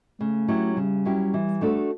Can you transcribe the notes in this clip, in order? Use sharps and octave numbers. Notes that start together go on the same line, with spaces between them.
C#3 A3
F#3 C#4 E4 G4
C#3 G3
F#3 C#4 E4 G4
E3
A3 D4 F#4 A4